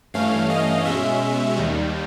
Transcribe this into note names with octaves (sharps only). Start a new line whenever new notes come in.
G2 E3 A3 C#4 F5
D#5
B2 G#3 C#4 E5
D#2 D#3 G3